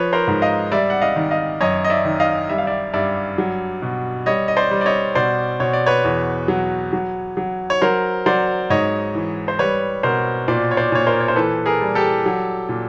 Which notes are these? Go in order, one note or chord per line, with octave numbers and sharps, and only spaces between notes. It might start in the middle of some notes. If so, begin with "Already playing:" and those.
Already playing: F3 B4 C#5
A#4 C5
G#2
D#5 F5
G3 D5 E5
F#5
D#5 F5
D#3
D#5 F5
F#2 C#5 D#5
D#5
D5 E5
D#3
D#5 F5
G3 E5
F5
D5 E5
G2 D5 E5
F#3
B2
G3 C#5 D#5
D#5
C5 D5
G3
D5
C#5 D#5
B2 C5 D5
B2 C#5
D5
B4 C#5
E2
F#3
F#3
F#3
C#5
F#3 A#4 C5
F#3 C5 D5
G#2 C#5 D#5
E3
C5
G3 B4 C#5
B2 A#4 C5
A#2 C5 D5
C#5
C5 D5
A#2 C#5
A#4 C5
C#5
C5
E3 A4 B4
G#4 A#4
G3
G4 A4
F#3
A#2